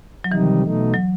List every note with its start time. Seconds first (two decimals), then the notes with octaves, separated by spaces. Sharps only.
0.24 F#3
0.32 C3 D#3 E3 G3 D#4
0.63 B2 A3 D#4
0.94 F#3